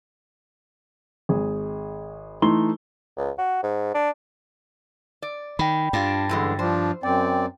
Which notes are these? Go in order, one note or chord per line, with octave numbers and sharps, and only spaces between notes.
G#1 G#4
E3 A3 D#4 C6 G7
C#2
F#4
G#2
D4
D5
D#3 G5 B5
G2 D4 F4
F#2 D3 E3 G#3
F3 D4 C5
F#2 C4 D5 G5